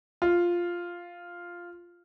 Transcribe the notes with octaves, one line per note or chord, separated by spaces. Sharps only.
F4